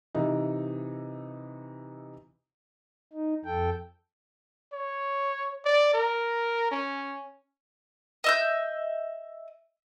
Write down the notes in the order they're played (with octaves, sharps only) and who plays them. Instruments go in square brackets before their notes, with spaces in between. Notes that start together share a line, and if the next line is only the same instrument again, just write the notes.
[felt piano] C3 E3 D#4
[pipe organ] D#4
F2 A4 G5
[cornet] C#5
D5
A#4
C#4
[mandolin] D#5 E5 G6